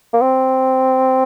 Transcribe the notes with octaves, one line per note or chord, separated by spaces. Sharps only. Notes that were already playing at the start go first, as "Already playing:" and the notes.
A#3
C4